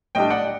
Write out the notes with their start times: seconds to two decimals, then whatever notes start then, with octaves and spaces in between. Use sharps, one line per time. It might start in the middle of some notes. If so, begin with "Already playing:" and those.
0.15 A2 G3 D4 D#5 G5
0.30 D5 F#5